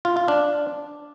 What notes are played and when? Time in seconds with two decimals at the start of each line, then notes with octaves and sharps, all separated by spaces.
0.05 F4
0.17 F4
0.28 D4